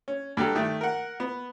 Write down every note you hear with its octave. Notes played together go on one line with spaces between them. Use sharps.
C#4
G2 F#4 G4 A4 A#5
D#3 A3
A#4 F#5
B3